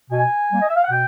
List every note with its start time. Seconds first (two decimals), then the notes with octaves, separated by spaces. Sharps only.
0.10 B2 G#5
0.51 G3 A#3
0.61 D#5
0.69 E5
0.76 F5
0.84 F#5
0.90 B2 G5